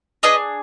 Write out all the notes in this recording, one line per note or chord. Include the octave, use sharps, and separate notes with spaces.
D4 G#4 B4 D#5